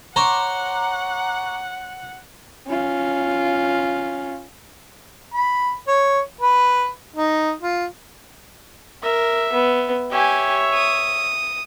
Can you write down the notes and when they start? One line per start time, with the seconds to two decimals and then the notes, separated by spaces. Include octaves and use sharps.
0.16 C5 C#5 F#5 A#5 C#6 D6
2.68 C#4 F4
5.34 B5
5.88 C#5
6.41 B4
7.16 D#4
7.61 F4
9.03 A#4 E5
9.53 B3
10.11 G4 C#5 E5 G#5
10.74 D#6